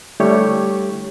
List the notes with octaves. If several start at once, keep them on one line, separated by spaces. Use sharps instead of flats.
D3 G3 A3 E4 G4 C#5